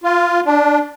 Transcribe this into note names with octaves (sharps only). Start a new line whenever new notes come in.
F4
D4